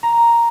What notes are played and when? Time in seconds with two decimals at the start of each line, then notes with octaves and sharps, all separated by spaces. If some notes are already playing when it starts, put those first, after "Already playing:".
0.03 A#5